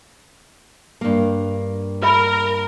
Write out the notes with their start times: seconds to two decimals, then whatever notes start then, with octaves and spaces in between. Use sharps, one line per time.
1.01 G2 A#3
2.02 A#4 B4 E5 B5